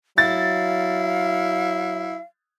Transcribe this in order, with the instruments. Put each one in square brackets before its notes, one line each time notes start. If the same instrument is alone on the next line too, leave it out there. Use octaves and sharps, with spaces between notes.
[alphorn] F#3 [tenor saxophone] E4 [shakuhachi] F5 [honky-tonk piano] A6